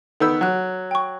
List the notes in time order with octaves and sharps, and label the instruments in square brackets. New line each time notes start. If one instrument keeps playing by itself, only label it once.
[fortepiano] D#3 B3 E6 [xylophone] A4 G6
[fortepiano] F#3 [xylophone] F#5 F#6
[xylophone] G5 C#6